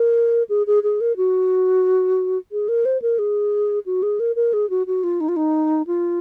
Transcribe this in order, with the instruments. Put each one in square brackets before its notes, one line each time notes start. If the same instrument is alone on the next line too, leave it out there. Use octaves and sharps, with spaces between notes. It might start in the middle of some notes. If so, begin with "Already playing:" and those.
Already playing: [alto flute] A#4
G#4
G#4
G#4
A#4
F#4
G#4
A#4
C5
A#4
G#4
F#4
G#4
A#4
A#4
G#4
F#4
F#4
F4
D#4
F4
D#4
F4